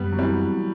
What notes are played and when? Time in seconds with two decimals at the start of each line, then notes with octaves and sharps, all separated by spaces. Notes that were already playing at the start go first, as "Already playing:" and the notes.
Already playing: F#2 G3 B3
0.12 F#3
0.18 E3 G3 C4